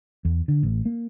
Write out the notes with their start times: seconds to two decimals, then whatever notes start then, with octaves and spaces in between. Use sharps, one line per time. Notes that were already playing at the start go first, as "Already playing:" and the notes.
0.25 E2
0.48 D3
0.63 A1
0.85 A#3